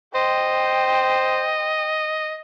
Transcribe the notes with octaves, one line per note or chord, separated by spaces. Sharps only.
C5 D#5 G5